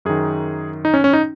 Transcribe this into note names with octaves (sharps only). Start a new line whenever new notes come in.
F#2 D#3 G#4
D#4
C#4
C#4
D#4